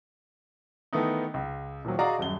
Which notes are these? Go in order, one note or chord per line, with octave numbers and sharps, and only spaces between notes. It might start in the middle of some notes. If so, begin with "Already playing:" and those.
D#3 E3 A3 B3 D#4
C#2
A#2 D#3 F3 F#3
F#4 G#4 D5 D#5 F5 A#5
D#1 F#2 G7